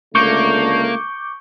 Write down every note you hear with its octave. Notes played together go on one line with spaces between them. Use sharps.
C#2 D3 A3 A#3 C#6 D6 G6